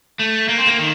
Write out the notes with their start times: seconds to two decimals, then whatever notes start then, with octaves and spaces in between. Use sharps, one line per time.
0.19 A3
0.48 A#3
0.58 C4
0.67 A#3
0.79 D#3